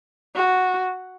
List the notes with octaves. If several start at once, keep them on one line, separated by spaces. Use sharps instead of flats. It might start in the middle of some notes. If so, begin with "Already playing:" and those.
F#4